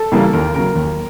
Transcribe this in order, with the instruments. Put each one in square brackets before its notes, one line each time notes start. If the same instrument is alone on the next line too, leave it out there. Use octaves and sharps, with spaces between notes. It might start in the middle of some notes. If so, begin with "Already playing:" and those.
Already playing: [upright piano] A4
[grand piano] C#3 E3 G3 A#3
[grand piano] D#2 [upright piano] A#4
[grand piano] C#3 F#3 [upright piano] A#4
[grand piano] D#2